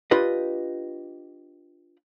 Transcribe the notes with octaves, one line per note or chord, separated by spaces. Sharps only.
D4 F4 G4 B4 D#5